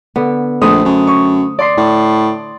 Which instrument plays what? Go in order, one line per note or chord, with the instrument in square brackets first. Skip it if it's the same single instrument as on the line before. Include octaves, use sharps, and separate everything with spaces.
[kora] D3 B3
[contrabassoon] A#1 [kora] A3 C5 [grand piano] D#6
[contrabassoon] F#2
[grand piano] C#6
D5 C6 C7
[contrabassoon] A2